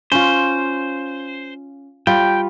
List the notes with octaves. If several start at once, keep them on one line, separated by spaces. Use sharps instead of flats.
C#4 F4 C5
G3 F4 G5